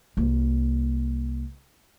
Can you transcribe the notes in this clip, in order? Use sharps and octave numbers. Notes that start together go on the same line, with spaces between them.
C2 A#3